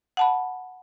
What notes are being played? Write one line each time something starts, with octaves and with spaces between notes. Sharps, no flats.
F#5 A5 B5